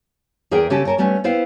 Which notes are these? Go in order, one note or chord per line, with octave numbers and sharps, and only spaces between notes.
E2 G#4 A#4 E5 G5
C#3 C#4 G4 A4
C#4 A#4 A5
G3 A3 B3 C#4
B3 E4 C5 F5 G5